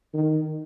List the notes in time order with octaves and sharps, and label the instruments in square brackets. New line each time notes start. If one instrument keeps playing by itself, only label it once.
[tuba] D#3